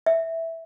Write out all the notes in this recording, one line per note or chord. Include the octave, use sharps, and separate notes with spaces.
E5